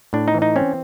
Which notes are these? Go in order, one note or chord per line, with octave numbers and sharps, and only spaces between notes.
A2 D4
D#4
E3
D#4
C4 C#4